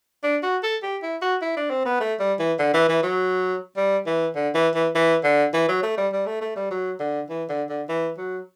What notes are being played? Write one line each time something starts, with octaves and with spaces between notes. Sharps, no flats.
D4
F#4
A4
G4
E4
F#4
E4
D4
C4
B3
A3
G3
E3
D3
E3
E3
F#3
G3
E3
D3
E3
E3
E3
D3
E3
F#3
A3
G3
G3
A3
A3
G3
F#3
D3
E3
D3
D3
E3
F#3